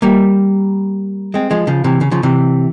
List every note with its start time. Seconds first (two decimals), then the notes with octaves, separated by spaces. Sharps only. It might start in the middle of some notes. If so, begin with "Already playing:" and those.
0.02 G3 A#3
1.34 G#3 C4
1.51 F3 G#3
1.67 C#3 F3
1.84 C3 E3
2.01 C#3
2.11 C#3 F3
2.23 C3 E3